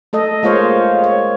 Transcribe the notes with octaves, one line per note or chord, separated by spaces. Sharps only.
A3 A4 D#5
G#3 A#3 F4 C5 C#5 F5
C#5